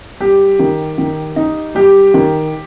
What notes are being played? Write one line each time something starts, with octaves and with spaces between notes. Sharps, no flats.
G3 G4
D#3
D#3
D#4
G3 G4
D#3